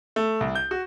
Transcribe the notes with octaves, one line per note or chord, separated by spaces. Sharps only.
A3
C2
G6
F#4